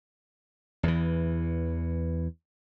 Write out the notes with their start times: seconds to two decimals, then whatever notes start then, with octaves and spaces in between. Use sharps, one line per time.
0.83 E2 E3